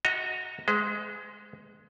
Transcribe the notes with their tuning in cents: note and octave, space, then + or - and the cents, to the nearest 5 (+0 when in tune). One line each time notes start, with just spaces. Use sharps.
F#4 -10 D#5 +25 A#5 -10
G#3 +10 C5 -45